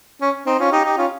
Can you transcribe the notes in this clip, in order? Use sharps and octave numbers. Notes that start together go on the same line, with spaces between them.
C#4
C4 D#4
C#4 F4
D#4 G4
D#4 G4
C#4 F4